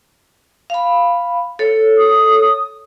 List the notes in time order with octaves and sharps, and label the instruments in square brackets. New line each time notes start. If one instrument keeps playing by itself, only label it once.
[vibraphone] F5 B5
A4 C#5
[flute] D#6